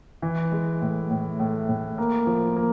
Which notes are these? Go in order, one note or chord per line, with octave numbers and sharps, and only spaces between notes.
E3
G#3
A2
A2
A2
A2
A#3
F3
A#3